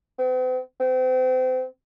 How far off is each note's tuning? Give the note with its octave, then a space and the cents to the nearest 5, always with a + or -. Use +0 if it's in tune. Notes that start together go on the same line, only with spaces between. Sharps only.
C4 -45
C4 -35